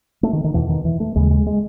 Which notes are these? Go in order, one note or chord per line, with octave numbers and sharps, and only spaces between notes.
A3
D#3
D#3
E2 B2 E3
D#3
E3
A3
D#2 C#3 G#3
G#3
G#3